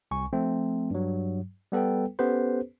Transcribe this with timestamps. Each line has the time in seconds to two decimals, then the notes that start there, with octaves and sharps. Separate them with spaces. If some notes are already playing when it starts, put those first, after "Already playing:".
0.11 C2 G#5 C#6
0.33 F3 A3 C4
0.91 G2 F#3
1.72 G3 B3 A4 B4 G5
2.19 B3 C#4 G4 A4 B4 C5